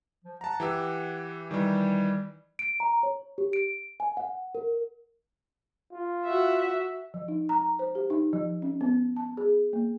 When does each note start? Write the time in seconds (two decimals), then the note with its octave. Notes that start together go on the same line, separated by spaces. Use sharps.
0.24 F3
0.41 F#5 A5 A#5
0.60 E3 G4 E6
1.51 D#3 E3 G3
2.59 D7
2.80 A#5
3.03 C#5
3.38 G4
3.53 D7
4.00 G#5
4.17 F#5
4.55 A#4
5.93 F4
6.24 F#4 E5 F#5
7.14 F3
7.28 D#4
7.49 A#5
7.79 C5
7.95 G4
8.10 D#4
8.33 F3
8.62 C#4
8.81 B3
9.17 A5
9.37 G#4
9.73 A#3